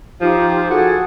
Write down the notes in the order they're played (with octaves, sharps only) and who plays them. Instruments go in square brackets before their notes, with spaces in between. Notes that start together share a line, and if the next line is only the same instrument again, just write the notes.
[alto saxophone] F3 [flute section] D#4 F4 G4
[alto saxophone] F#4 [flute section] G#4 A4